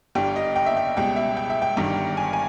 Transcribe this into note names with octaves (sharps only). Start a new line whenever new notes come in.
G1 G2 G3 G5
D#5
G5
E5
G5
C#2 B2 G3 G5
E5
G5
E5
G5
G1 G2 D#3 G3
G#5
G#5